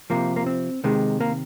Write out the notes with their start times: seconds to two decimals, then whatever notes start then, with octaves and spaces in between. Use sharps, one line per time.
0.10 C3 F3 A#3
0.36 A#3
0.47 C4
0.84 C3 D#3 G#3
1.20 A#3